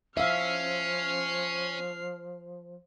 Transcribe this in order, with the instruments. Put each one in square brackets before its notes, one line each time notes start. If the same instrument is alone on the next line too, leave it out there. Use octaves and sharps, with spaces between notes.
[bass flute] F3 [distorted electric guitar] C#4 [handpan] E5 F5 [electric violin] F6 C7